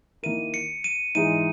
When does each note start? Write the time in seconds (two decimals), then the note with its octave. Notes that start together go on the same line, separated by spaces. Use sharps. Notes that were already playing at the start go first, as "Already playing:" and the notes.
0.23 D#3 A#3 E4 A#4 D#7
0.54 C#7
0.84 D#7
1.15 G#2 E3 G#3 D#4 D#7